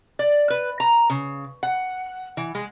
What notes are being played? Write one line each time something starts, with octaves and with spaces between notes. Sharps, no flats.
D5
B4
A#5
C#3
F#5
E3
G#3